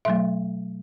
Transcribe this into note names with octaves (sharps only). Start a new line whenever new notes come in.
B2 F#3 A3 E5